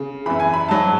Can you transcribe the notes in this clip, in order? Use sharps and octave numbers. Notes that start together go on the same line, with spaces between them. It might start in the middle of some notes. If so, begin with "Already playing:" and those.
Already playing: C#3
F#2 E3 B5
G#5
B5
G#2 F#3 A5